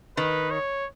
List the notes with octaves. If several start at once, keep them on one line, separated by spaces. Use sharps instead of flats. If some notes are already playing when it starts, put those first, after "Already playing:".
D#3 B4
C#5